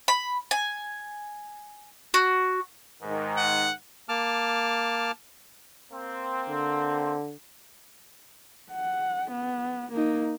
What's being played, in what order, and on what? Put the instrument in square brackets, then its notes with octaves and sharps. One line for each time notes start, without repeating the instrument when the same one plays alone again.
[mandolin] B5
G#5
F#4
[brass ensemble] G#2 D#3
[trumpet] F#5
[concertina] A#3 A5 D6 F6
[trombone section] A#3 C4
[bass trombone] D3
[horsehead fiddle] F#5
B3
A#3 D#4